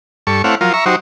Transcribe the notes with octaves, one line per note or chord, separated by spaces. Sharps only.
G2 A4 C#6
A3 C4 E4 C#5 F5 F#5
F3 F#3 F4 A#4
E5 A#5 C#6
F#3 D#4 F#4 G4 C5